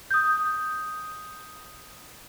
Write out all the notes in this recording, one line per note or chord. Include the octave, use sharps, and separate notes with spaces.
D#6 G6